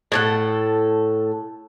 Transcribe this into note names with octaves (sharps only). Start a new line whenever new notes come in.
A2 A4 F#5